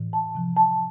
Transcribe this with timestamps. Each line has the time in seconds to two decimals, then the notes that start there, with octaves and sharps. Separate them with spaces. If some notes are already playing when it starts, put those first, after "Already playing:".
Already playing: A2 E3
0.13 A5
0.35 C3 F3
0.57 A5